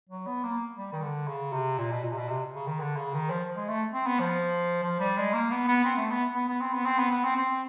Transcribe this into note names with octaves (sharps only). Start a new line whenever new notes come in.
F#3
B3
A#3
G3
D#3
D3
C#3
C3
A#2
B2
A#2
C3
B2
C3
C#3
D#3
D3
C#3
D#3
F3
G#3
A3
C4
B3
F3
F3
G3
G#3
A#3
B3
B3
C4
A3
B3
B3
B3
C4
B3
C4
B3
B3
C4
C4